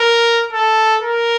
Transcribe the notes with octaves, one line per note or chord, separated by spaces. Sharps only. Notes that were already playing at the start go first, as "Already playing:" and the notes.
Already playing: A#4
A4
A#4